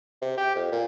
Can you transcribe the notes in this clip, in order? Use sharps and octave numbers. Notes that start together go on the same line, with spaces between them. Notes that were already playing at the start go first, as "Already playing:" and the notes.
C3
G4
F2
A#2